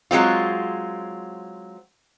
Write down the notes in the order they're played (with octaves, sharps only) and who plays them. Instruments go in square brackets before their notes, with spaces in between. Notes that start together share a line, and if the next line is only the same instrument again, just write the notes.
[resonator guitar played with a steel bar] F#3 G#3 C4 F4